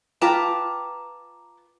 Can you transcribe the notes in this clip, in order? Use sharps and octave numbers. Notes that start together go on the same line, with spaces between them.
F4 B4 G5 A5 A#5 D6